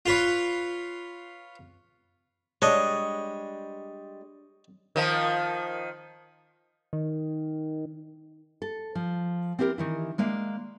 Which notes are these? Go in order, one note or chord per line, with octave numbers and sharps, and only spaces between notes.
F4 B4 C#5
G3 G#3 D4 C#5 D#5
D#3 F3
D#3
A4
F3
C4 E4 G4 A4 A#4
D#3 E3 E4
G#3 A#3 D4 E5